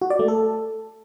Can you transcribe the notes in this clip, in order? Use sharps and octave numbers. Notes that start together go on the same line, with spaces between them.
F#4
D5
A3
A4